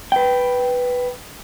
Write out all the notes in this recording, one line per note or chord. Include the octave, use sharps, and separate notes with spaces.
B4 G5